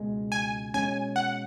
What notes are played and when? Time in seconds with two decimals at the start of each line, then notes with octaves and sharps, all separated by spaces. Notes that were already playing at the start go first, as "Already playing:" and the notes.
Already playing: C#2 B2 G#3
0.32 G#5
0.74 B2 G#3 C#4 G#5
1.16 F#5